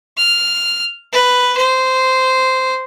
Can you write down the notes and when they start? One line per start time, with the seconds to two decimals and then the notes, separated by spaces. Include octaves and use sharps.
0.17 F6
1.13 B4
1.57 C5